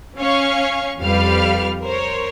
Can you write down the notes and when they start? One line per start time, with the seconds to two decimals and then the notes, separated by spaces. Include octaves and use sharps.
0.18 C#4 C#5 F5 C#6
1.02 F2 G3 B4 F5 F6
1.82 A#4 C5 C#5